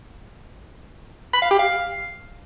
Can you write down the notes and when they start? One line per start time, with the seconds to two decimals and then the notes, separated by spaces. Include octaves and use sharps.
1.33 B5
1.42 F5
1.50 G4
1.59 F5